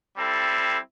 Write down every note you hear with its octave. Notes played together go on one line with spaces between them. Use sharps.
G3 C4 E4 A4